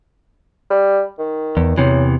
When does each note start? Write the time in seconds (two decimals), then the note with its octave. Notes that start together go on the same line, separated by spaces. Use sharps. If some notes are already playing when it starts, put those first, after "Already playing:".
0.70 G3
1.18 D#3
1.57 E2
1.78 E2 C3 E3 F#3